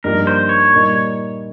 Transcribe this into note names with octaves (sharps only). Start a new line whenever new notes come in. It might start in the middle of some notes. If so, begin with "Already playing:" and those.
G2 F3 A#3 D#4 G4 A#4
C5
C#5
A#2 G3 A#3 D#4